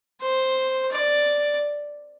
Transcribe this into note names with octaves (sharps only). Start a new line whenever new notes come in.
C5
D5